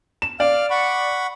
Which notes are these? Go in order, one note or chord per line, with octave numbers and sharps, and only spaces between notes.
E7
D5 F5 F6
F#5 B5 C#6